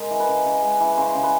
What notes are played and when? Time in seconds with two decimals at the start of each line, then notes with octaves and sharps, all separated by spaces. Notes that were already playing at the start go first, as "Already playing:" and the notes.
Already playing: G#3 A#4
0.11 E3
0.20 B4
0.28 C#3
0.45 C#3
0.62 G#3
0.80 E3
0.97 C#3 C5
1.15 C#3
1.23 B4